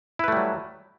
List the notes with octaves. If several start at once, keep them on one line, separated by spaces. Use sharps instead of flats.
F#3 G3 A3 E4 B4